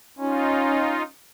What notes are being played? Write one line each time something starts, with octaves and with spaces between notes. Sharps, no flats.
C#4 D#4 F4